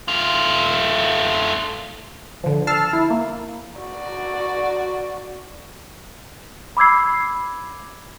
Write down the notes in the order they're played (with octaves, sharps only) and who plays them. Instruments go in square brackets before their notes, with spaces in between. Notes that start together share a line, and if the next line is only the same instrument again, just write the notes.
[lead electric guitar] A3 F4
[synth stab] D3 F3
A5 E6 F6 C7
E4
A#3
[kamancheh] F#4 D5
[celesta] B5 D6 E6 G#6 C7